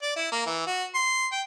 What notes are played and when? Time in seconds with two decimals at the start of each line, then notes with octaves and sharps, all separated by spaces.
0.02 D5
0.16 E4
0.32 A#3
0.46 E3
0.67 F#4
0.95 C6
1.32 G5